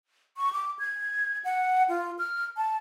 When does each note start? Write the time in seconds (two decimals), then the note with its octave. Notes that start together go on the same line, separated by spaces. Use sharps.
0.37 C#6
0.53 D6
0.79 G#6
1.45 F#5
1.88 F4
2.19 F6
2.57 A5